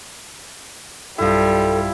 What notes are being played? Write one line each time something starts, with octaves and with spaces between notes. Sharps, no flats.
B1 G2 F3 G3 E4 A4 G5